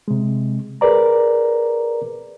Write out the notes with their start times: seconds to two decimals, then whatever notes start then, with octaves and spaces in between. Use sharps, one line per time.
0.08 C3 G#3
0.81 G#4 A#4 B4 D5 A#5